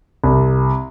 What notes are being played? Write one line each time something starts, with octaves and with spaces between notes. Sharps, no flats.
C2